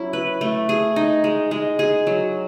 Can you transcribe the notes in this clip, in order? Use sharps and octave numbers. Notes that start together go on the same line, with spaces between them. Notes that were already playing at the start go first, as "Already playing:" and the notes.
Already playing: F#3 C#4 E4
B4
A3
G#4
D#4
G#3
G#3
G#4
F#3